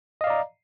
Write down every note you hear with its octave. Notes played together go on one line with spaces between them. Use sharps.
D5 D#5 F5 A#5